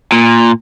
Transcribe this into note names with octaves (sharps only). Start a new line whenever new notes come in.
A#2